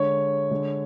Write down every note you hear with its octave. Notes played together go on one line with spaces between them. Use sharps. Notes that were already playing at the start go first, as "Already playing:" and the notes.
Already playing: D3 G#3 C#5
D3 G#3